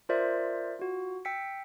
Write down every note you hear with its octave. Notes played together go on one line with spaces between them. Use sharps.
F4 A#4 C5 D5 E5
F4 F#4
G5 E6 B6 C#7